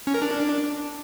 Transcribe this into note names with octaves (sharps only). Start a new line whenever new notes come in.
C#4
A#4
D4